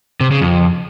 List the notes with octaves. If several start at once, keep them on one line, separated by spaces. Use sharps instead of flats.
C3
C#3
F2